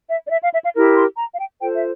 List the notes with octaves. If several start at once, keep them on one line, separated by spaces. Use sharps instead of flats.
E5
D5
E5
F5
E5
F5
E4 G4 A#4
C6
A#5
F5
G5
F4 A4 C5 G5
E5